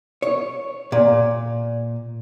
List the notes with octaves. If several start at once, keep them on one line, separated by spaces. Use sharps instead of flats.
C#5
A#2